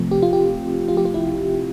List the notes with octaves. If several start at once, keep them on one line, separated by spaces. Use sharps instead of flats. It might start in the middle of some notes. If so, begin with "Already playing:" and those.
Already playing: C3 F3 A3 C4
G4
F4
G4
F4
G4
F4
E4